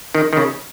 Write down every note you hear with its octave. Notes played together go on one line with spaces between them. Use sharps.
D#3
D#3
C#3